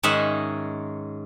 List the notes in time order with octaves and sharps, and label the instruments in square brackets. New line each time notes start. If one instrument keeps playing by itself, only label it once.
[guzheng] G#2 D#3 C#4 G#4 E5 F#5